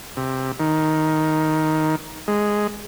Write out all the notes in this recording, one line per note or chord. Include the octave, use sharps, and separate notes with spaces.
C3
D#3
G#3